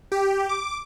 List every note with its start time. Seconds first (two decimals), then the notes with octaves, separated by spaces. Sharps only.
0.12 G4
0.49 D6